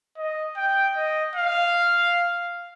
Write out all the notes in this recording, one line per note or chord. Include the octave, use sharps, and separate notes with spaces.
D#5
G5
D#5
F5